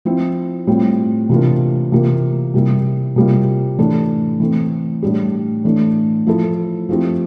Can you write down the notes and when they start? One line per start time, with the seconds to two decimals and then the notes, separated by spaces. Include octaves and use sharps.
0.05 F3 C4 E4
0.67 A2 G3 C4 F4
1.29 C3 E3 A#3 D4 F4
1.92 C3 E3 A#3 F4
2.54 C3 G3 A#3 E4
3.16 C3 G3 A#3 F4
3.78 A2 E3 A3 D4 A4
4.40 E3 A3 C4
5.03 A2 G3 D4 G4
5.64 A2 E3 A3 D4
6.27 F3 A3 E4 A4
6.89 F3 A3 C4 E4 G4